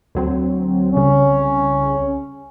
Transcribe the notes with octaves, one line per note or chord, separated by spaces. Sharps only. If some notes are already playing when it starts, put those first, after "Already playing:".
D2 F#3 C4
C2 C#3 C#4